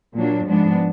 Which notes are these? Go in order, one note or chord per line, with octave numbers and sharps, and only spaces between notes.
A#2 F#3 A#3 D4
G#2 F3 G#3 B3 D4